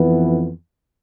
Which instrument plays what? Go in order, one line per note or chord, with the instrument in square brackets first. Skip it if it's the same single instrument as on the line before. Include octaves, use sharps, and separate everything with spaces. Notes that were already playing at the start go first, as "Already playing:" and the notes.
Already playing: [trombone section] F2 E3 B3